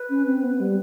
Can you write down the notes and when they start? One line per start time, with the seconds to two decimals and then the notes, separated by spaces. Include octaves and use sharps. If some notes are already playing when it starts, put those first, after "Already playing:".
Already playing: B4
0.10 C#4
0.26 C4
0.43 B3
0.60 G3